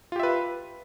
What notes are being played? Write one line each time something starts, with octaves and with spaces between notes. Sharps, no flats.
F4 G4 B4 E5